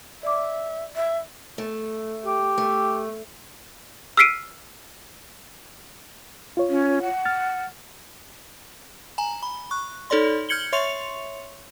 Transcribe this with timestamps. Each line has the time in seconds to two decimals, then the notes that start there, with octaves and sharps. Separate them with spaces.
0.23 D5 E5 D6
0.96 E5
1.58 A3
2.25 G4
2.58 A3
4.17 E6 F6 B6 C7 D7 D#7
6.57 F4 C#5
6.70 C#4
7.02 F#5
7.25 F6 A6
9.18 G#5 A#5
9.43 B5
9.71 C#6 F#6
10.10 D#4 A4 C#5 D5 C6
10.49 F6 G6 G#6 C#7 F#7 G7
10.73 C#5 E5 C6 C#6 C#7 F7